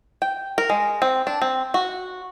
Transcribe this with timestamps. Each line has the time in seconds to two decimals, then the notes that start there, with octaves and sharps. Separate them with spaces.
0.22 G5
0.58 A#4
0.70 G#3
1.02 C4
1.27 D4
1.42 C4
1.74 F#4